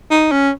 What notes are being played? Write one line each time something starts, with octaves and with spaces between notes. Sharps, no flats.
D#4
C#4